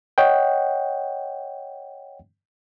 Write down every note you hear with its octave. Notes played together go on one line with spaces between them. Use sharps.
C#5 D#5 F#5 G5